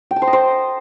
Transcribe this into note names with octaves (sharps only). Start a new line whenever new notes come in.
G5
A5
C5
D#5
C5